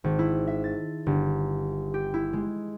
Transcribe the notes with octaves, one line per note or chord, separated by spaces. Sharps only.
G#1
E4
E5
A6
G1
G4
E4
G#3